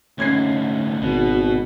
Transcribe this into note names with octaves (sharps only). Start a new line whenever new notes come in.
D2 G#2 C#4 G#6 C7
G#1 B2